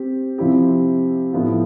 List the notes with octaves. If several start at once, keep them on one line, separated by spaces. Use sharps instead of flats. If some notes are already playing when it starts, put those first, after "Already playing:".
Already playing: C4 G4
C3 F3 C4 E4 G4
A2 F3 B3 F4